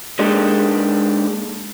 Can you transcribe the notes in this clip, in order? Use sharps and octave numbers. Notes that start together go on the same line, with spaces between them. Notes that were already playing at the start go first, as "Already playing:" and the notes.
G#3 A#3 D4 D#4 G4 A4